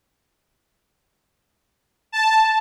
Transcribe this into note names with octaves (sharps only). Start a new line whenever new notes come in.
A5